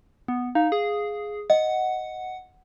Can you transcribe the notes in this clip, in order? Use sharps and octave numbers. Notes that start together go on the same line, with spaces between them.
B3
D#4 F5
G#4
D#5 F#5